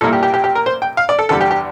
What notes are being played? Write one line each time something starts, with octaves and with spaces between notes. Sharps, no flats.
A#2 G3 A#3 E4 A4
G4
G4
G4
G4
A#4
C5
G5
F5
D5
A4
E2 D3 G3 A4
G4
G4